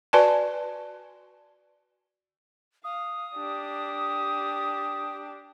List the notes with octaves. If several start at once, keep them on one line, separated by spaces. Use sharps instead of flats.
F#4 B4 D5 G#5 A5
F5 D#6
D4 G4